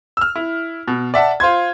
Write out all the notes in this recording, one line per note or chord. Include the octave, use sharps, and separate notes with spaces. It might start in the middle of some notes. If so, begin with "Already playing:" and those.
E6 F6
E4
B2
D5 E5 F#5 A5
F4 C5 C6 G#6